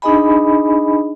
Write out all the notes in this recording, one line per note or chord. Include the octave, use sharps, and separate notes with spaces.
D4 D#4 G#4 D#5 G#5 B5